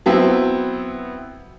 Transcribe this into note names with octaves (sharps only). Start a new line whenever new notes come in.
F#3 B3 C4 E4